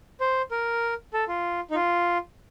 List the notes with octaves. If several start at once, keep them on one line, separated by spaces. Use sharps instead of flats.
C5
A#4
A4
F4
D#4
F4